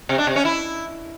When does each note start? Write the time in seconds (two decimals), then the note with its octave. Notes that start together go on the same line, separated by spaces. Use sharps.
0.09 C3
0.18 D4
0.27 C3
0.36 C#4
0.45 E4